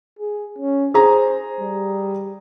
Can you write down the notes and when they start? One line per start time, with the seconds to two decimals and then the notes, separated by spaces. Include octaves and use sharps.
0.19 G#4
0.59 C#4
0.94 G#4 C5 A#5
1.61 G3